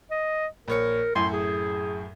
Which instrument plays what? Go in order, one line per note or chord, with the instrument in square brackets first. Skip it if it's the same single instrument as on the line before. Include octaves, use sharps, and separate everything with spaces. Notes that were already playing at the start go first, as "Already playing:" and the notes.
[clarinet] D#5
[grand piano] A#1 C#5 C#7 [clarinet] A#4
[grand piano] F#2 A2 [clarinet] C6
[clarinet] G#4